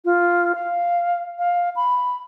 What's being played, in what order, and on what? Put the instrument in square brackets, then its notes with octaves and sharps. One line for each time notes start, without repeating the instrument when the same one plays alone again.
[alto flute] F4
F5
F5
B5